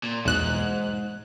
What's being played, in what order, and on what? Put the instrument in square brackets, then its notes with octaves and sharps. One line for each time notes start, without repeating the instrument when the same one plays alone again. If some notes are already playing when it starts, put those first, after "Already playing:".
[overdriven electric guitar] A#2
[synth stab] B1 E2 F#6 [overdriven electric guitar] G#2